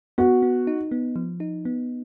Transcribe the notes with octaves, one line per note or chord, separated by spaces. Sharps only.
B3 F#4
B3
D#4
B3
F3
D#4
B3